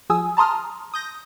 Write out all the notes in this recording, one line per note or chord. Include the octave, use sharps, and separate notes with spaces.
F3 G#4 G#5 D#6 E6
A5 A#5 C6 D#6 F6
D#6 G6 A#6